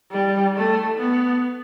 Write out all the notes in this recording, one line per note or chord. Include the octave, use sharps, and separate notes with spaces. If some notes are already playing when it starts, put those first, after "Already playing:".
G3
A3
B3